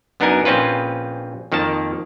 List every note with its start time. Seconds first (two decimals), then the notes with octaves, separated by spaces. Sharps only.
0.20 F#2 B3 D4 D#4 A#4 G#5
0.45 A#1 C4 C#4 F4 B4
1.52 F2 D#3 F3 A#3 A5